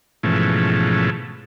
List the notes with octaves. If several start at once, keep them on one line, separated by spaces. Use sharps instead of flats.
G#2 B2 E3 F3 A3 C#4